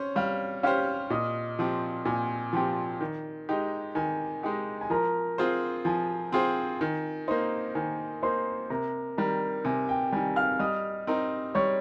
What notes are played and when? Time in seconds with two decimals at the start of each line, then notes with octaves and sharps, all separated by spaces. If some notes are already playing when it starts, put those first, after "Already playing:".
Already playing: C#4 C5 C#5
0.16 G3 F5 F6
0.63 C#4 G4 C5 F5 F6
1.10 A#2 D#5 D#6
1.59 F3 C4 G4
2.05 A#2 G#5
2.53 F3 C4 G4 G5
3.01 D#3
3.49 G#3 D#4 G4
3.95 D#3 G#5
4.43 G#3 D#4 G4
4.81 G#5
4.90 F3 A#4 A#5
5.38 C4 F4 G#4 C5
5.85 F3 G#5
6.32 C4 F4 G#4 C5 G5
6.80 D#3 G#5
7.28 A#3 D#4 C5 C6
7.75 D#3 G#5
8.22 A#3 D#4 C5 C6
8.70 C3 A#4 A#5
9.18 D#3 G3 A#4 A#5
9.65 C3 G#5
9.89 G5
10.12 G3 G#5
10.16 D#3
10.36 F5 F6
10.59 G3 D#5 D#6
11.07 C4 D#4 A#4
11.55 G3 C#5 C#6